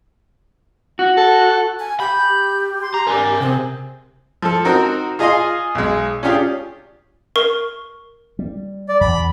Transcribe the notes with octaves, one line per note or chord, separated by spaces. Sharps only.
F#4
A4
G#5
G4 B5 G6
C6
A#5
D4 A#4 G#5
C3 C4 G#4
F3 A4
C4 D#4 F#4 A#4
F4 G#4 D#5 F5 G#5 C6
B1 G#3
C#4 D4 F4 G4 G#4
A#4 C#6
G3
D5
E2 B5